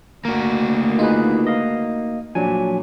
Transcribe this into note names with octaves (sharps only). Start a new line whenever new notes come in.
D2 A#3 F#4 A#4
D#4 F4 G#4 B4
D#5 F5
A#2 F3 F#3 D4 G#5